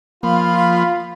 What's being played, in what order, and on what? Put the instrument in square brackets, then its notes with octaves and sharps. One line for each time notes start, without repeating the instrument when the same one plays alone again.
[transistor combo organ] F3 [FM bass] A#3 [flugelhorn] F4 [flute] B5